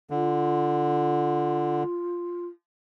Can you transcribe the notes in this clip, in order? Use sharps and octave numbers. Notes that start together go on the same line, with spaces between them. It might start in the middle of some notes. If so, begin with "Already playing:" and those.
D3 F4